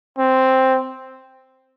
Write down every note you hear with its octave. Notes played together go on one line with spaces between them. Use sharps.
C4